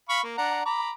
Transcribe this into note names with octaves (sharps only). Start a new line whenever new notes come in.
F5 B5 C#6
A#3
D4 F#5 A#5
A#5 B5 D6